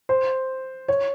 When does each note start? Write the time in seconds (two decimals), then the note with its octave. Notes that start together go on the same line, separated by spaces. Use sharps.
0.09 C5
0.88 C#5